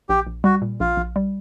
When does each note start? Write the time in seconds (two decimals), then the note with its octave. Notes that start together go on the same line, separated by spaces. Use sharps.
0.09 A#1 G4
0.27 A#1
0.44 G3 F#4
0.62 A#2
0.80 A#1 F4
0.97 A#1
1.16 G3